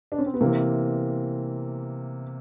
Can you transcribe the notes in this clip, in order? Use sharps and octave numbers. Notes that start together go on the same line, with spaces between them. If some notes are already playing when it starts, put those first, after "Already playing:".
D4
C#4
C4
B3
C3 E3 A#3